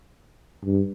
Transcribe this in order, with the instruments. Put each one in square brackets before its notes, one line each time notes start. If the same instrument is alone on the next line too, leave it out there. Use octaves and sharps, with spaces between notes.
[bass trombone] G2